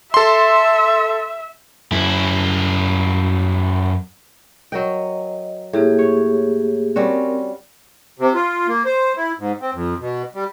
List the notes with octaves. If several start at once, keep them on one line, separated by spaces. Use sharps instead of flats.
A4 E5 C6
F#2 E4
F#3 A#4 D#5 G5
A2 A#3 G4 G#4
C#5
G3 C4 C#4 F#4 A#4
C3
F4
A#3
C5
E4
G#2
C4
F2
B2
G3